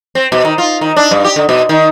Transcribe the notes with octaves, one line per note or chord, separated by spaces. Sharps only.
C4
B2
D#3
F4
D#3
D4
G2
G4
D3
B2
D#3